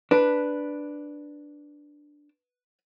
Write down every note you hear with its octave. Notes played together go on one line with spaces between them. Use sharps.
D4 B4